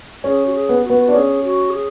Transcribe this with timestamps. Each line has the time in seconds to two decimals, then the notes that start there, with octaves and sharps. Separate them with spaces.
0.24 C#4 G#4
0.46 F#4
0.54 G#4
0.69 B3
0.84 F#4
0.90 B3
1.05 D4 F#4
1.14 C#4 G#4
1.44 F#4
1.73 G#4